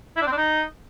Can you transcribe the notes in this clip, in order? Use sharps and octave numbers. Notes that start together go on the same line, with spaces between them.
E4
D4
C4
D4
D#4